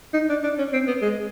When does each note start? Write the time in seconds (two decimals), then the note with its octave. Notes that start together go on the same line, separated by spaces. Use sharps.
0.14 D#4
0.29 D4
0.43 D4
0.58 C#4
0.73 C4
0.87 B3
1.02 G#3